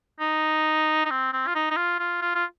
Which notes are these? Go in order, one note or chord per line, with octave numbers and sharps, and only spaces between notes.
D#4
D#4
C4
C4
F4
D#4
D#4
F4
F4
F4
F4